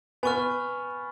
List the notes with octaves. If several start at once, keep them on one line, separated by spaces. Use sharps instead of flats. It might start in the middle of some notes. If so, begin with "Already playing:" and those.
B3 G#5 C#6 F6